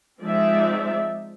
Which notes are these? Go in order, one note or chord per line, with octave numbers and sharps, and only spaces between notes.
F3 G#3 C4 D#4 D5 E5